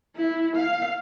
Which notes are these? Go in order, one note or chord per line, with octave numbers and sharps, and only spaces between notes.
E4
F5